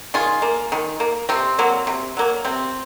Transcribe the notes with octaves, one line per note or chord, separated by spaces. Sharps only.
D#3 F4 G#4
A#3
D#3
A#3
C3 C4
F#3 A#3
C3
F#3 A#3
C3 C4